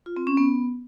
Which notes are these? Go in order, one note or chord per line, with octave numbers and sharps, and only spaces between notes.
F4
C4
C#4
B3